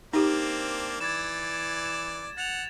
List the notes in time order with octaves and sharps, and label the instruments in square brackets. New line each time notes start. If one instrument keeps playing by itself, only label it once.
[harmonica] A#3 C4 D4 [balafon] D#4 G4
[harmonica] E3 D5 [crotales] G#6 A6 E7
[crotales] E7
[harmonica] F#5 [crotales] A6 F7